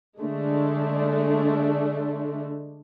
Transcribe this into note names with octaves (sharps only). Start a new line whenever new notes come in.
D3 G#3 A3 D4